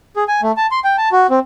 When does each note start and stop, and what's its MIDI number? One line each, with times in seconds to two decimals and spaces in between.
0.16 0.24 68
0.28 0.41 80
0.42 0.52 57
0.57 0.67 81
0.71 0.80 84
0.84 0.96 79
0.98 1.09 81
1.12 1.27 66
1.30 1.39 60